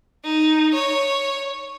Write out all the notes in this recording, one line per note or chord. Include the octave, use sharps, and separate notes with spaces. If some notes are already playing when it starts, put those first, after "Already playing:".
D#4
C#5